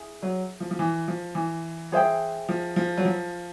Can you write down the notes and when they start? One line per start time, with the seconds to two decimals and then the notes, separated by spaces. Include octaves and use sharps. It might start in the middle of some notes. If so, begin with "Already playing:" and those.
Already playing: E4 G#4
0.23 F#3
0.60 F3
0.71 F3
0.79 E3
1.08 F3
1.35 E3
1.92 G#4 C5 E5 G5
2.49 F3
2.76 F3
2.98 F#3
3.05 F3